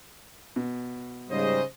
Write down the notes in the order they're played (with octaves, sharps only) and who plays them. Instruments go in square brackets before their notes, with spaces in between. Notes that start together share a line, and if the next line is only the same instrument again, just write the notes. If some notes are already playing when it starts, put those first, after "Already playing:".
[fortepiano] B2
[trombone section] G#2 G3 [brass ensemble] C#3 C5 D#5